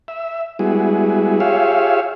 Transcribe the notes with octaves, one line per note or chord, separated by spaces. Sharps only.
E5
G3 G#3 B3 E4 F#4 G#4
F4 G4 G#4 C#5 E5 F5